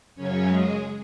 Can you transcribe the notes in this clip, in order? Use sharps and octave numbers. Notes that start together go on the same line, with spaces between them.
F#2 C#3 F#3 C#4 C#5
G#3 G#4